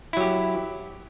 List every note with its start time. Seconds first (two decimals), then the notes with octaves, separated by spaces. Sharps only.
0.13 E4
0.17 F#3
0.20 G4